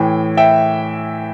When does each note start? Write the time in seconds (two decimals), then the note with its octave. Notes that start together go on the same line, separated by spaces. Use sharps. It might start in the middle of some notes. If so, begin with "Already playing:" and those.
Already playing: A2 E3 G5
0.37 E5 G5